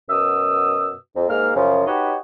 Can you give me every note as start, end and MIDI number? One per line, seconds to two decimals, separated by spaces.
0.09 0.93 42
0.09 0.93 47
0.09 0.93 87
0.09 0.93 88
1.15 1.29 41
1.29 1.51 44
1.29 1.51 58
1.29 1.51 89
1.55 1.86 42
1.55 1.86 49
1.55 1.86 53
1.87 2.14 63
1.87 2.14 66
1.87 2.14 67
1.87 2.14 71
1.87 2.14 73
1.87 2.14 75